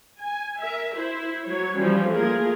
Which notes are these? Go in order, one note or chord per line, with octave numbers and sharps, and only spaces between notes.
G#5
A#4 E5
E4 C5
F#3 C#5
E3 F3 G3 C#4
A3 A#3 F4 G#4 A#4